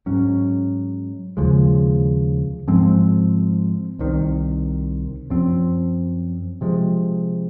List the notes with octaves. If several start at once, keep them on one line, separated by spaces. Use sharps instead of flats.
G#2 F#3 C#4
D#2 C#3 F3 G#3
G#2 F3 G#3 C4
C2 C3 D#3
F#2 F3 C4
C3 F3 G#3